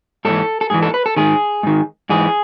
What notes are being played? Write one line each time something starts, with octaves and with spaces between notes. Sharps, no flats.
G#2 E3 A4
A4
G#2 E3 G#4
A4
B4
A4
G#2 D#3 G#4
G#2 D#3
G#2 E3 G#4